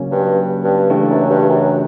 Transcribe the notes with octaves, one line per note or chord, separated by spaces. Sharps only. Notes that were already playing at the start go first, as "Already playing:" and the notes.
Already playing: C#3 F#3 A#3 C#4
G2
G2
G2 C#3 E3 A3 D4
F#2
G2
F#2